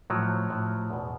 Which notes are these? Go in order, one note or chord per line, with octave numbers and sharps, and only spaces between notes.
A2 F3 F#3
A2 F3
E2 B2